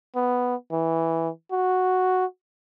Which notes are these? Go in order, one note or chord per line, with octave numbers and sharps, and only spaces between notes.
B3
E3
F#4